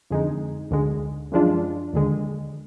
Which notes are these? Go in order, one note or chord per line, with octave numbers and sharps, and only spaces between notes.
F2 D3 G#3 D#4
D2 D3 G#3
F#2 F3 G#3 D4 F4
D#2 D3 G#3